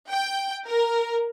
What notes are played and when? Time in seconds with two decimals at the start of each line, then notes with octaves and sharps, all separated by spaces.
0.10 G5
0.67 A#4